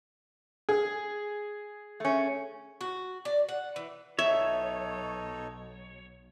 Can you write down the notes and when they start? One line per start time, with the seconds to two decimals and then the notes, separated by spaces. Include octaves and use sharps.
0.69 G#4
2.00 A3 C#4
2.81 F#4
3.25 D5
3.49 F#5
3.76 E3
4.19 B1 B2 D#4 A4 C#5 E5